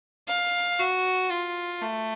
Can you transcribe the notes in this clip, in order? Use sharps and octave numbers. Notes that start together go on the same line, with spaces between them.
F5
F#4
F4
A3